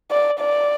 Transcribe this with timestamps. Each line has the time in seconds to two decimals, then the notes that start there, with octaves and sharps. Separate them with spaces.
0.11 D5
0.40 D5